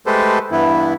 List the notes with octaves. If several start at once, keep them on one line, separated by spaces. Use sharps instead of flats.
G#3 A3 G4 A4 B4 C5
G2 E3 B3 E4